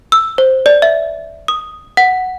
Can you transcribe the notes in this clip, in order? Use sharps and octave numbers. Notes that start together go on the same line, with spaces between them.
E6
C5
D5
E5
D#6
F#5